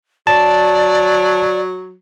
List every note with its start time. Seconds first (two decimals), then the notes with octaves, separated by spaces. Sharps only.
0.27 F#3 D5 A5